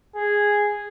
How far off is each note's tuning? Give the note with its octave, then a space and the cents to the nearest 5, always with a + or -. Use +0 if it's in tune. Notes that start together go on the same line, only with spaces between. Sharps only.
G#4 -5